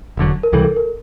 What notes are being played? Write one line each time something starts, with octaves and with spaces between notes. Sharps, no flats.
E1 D2 D3 F#3
A#4
C#2 C3 E3 G3 A4
A4
A#4